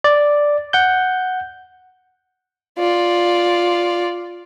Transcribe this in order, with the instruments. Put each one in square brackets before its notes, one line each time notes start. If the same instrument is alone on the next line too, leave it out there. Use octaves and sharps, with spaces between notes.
[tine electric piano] D5
F#5 G6
[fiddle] F4 D5